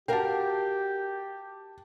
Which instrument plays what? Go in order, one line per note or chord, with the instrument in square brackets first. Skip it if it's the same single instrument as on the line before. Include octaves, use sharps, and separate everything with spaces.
[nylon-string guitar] F#4 A#4 F5 [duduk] G4 [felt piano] G5 A5